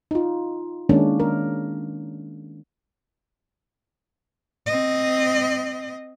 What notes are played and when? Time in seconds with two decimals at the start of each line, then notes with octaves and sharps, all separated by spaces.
0.11 D#4 F4
0.89 D#3 G#3 A#3 C#4 D4
1.20 A#4
4.66 C4 D#5